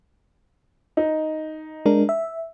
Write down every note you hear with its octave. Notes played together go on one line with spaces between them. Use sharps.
D#4
G#3 D4 A#4
E5